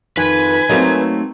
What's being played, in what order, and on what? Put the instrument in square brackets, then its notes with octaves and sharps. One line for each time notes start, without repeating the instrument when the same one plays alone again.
[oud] F2 [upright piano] D#3 [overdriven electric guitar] B4 [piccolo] G#5
[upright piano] F#3 C4 [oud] A3 A#3 D#4